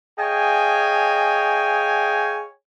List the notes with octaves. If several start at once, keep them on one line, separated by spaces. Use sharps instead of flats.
G#4 C#5 D#5 F5 G5 G#5